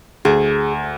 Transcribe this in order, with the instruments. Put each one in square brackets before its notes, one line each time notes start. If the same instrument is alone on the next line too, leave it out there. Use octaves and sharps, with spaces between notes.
[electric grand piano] D2 [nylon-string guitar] G#4